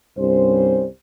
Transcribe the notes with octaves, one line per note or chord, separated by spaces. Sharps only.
C2 G2 G3 C#4 C5